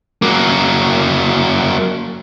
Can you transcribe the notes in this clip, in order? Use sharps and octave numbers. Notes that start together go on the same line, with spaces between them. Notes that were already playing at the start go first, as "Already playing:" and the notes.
F#3 A#3